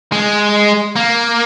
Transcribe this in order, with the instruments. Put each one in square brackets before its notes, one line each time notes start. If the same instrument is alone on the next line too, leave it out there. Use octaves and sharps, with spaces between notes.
[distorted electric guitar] G#3
A#3